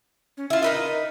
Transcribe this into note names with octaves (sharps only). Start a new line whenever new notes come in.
C#4
E4 F4 E5
D#4 A#4 B4 D#5